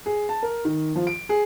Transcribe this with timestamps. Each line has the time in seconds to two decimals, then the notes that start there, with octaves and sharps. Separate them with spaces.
0.06 G#4
0.29 A5
0.43 A#4
0.65 D#3
0.95 F3
1.07 D7
1.29 G#4